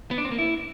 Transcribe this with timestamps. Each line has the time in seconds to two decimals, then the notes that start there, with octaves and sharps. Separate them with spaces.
0.11 B3
0.18 D4
0.25 C4
0.32 A#3
0.38 E4